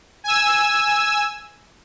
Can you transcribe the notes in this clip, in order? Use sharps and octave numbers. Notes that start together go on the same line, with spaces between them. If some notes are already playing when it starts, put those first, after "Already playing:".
G#5 E6